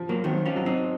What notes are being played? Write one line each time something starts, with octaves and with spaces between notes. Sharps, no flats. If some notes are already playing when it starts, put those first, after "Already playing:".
Already playing: F3
F#3 A#3
D#3 F#3 C4
C#4 F4
F#3
C4 D#4